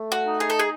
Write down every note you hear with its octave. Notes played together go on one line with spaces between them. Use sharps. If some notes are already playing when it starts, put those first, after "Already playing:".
Already playing: A3
F#4
D#4
G#4
A4
G#4